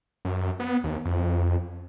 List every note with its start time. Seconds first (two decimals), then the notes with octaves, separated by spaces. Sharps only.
0.25 F#2
0.60 B3
0.84 D#2
1.05 F2